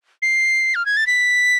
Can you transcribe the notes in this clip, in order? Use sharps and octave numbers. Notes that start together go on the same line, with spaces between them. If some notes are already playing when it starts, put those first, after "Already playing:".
C7
F6
G#6
A6
B6